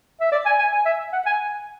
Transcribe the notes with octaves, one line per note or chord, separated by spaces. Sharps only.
E5
D5
G#5
G#5
G#5
E5
F#5
G#5